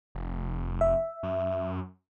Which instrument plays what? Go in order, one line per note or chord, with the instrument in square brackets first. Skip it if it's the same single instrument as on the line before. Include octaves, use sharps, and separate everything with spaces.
[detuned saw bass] F1
[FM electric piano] E5
[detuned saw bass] F#2